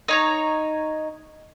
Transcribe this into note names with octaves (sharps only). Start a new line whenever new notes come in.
D#4 C#5 A#5